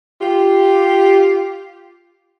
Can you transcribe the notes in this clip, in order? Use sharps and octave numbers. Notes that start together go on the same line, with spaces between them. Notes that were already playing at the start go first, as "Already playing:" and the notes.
F4 G4